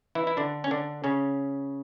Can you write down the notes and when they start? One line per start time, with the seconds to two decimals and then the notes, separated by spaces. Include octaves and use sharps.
0.15 E3 E4
0.27 E4
0.37 D3 D4
0.64 C#4
0.71 D3 D4
1.04 C#3 C#4